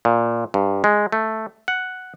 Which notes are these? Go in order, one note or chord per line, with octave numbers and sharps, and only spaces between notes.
A#2
G2
G#3
A3
F#5